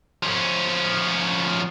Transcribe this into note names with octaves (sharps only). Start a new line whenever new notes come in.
F3 C#4